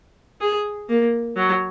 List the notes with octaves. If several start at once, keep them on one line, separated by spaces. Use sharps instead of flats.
G#4
A#3
F#3